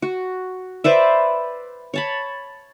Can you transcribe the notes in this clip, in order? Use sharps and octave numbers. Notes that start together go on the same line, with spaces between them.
F#4
B4 C5 D5 E5
C#5 A5 B5